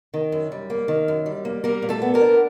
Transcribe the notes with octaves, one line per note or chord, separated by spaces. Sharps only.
D#3
F#2
G3
A#3
D#3
F#2
G3
A#3
G3 A#3 A#4
A#2
A3 A4
B3
A#3 A#4
D4